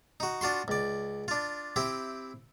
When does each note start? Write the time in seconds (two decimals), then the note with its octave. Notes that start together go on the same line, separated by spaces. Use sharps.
0.20 D#4 F#4
0.41 D4 F4 F#4 C6
0.68 C#2 D5
1.28 D4 F4
1.76 C4 E4 G4